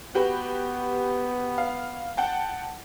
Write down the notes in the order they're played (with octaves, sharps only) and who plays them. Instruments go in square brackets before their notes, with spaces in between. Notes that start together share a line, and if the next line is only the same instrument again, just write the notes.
[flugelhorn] B3 [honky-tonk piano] F#4 G4 B4
[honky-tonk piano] F5
F#5 G5 A5